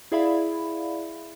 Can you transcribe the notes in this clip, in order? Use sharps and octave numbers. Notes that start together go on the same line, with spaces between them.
E4 G#4 D5 E5 F5 B5